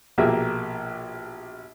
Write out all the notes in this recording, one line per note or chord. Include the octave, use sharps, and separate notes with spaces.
A#1 B2 A#3 G4 G#4 E5